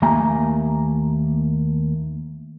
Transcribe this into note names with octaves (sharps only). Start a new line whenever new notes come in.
D#2 A3 A#3 G#5 A#5